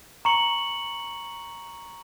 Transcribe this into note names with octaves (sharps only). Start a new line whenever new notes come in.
A#5 C#6 C#7 F#7